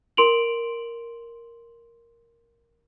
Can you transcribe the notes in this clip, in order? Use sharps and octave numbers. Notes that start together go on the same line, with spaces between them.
A#4 C6 D7 F7 F#7